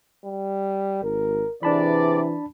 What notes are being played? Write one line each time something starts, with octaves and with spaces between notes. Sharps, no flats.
G3
G#1 A#4
C3 E3 D4 G#4 B4 D5 A5 B5